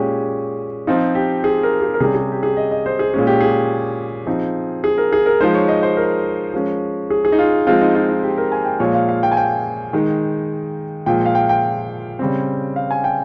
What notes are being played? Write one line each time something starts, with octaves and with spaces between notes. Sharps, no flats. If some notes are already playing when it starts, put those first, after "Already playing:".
Already playing: A#2 G#3 C#4 G4 G#4
F3 C4 D#4 F4
G4
G#4
A#4
G#4
A#4
C3 G3 C#4 G#4
G#4
G4
G#4
D#5
D#5
C5
G#4
A#2 G#3 C#4 G#4
G4
G#4
F3 C4 D#4
G#4
A#4
G#4
A#4
F3 G#3 D#4 C5
C#5
D#5
C5
A#4
F3 G#3 C#4
G#4
G#4
D#4
F4
F3 G#3 C4 F4
D#4
F4
D#4
G4
A#4
G#5
G5
A#2 F3 G#3 C#5
F5
F5
G5
G#5
G5
D#3 G#3 D#4
A#2 F3 G#3 G5
F5
G5
G5
C#3 G3 C4
F5
G#5
G5